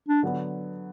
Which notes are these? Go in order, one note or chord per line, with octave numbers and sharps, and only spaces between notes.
D4
D3 F#3 B3